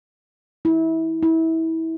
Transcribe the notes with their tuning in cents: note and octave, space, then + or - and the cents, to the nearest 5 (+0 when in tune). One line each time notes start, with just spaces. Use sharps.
E4 -25
E4 -25